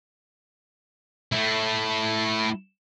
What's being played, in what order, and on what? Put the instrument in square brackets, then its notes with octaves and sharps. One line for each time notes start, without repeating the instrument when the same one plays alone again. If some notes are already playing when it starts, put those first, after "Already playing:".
[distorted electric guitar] A3 E4